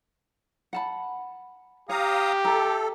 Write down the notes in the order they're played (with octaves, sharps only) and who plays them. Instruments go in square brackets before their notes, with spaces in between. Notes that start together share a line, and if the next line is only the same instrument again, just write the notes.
[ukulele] F#5 A5 B5
[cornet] G4 [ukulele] C#5 [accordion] F5 A#5 D#6
[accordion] A4 [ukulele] E5 A#5